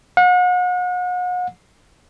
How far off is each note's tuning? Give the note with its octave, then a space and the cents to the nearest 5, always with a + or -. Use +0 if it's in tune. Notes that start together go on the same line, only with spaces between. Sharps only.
F#5 -40